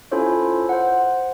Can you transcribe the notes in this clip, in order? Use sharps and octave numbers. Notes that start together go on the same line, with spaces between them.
C#4 E4 F4 A4 C5 C#5
C5 F#5